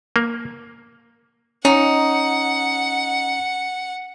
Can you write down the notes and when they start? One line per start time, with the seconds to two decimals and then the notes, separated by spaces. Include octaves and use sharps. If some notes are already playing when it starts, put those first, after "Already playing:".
0.16 A#3
1.65 C#4 D#4 F#5